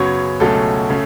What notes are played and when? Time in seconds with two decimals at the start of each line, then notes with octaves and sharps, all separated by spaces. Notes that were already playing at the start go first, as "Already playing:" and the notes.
Already playing: F#2 C#3 F#3 B3 C#5
0.40 C#2 B2 F#3 A3 C#4 A4
0.90 C#3 A3 C#4